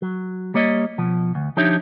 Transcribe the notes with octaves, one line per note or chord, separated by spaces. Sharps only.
F#3
G3 A#3 C#5 D#5
B2 F3
D2
F3 D4 D#4 G4 C#5 E5